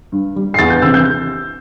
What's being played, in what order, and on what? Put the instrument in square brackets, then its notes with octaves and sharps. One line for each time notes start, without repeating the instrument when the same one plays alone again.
[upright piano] G2
G3
C7
E2 A6
G6
C3 E3 E6
G6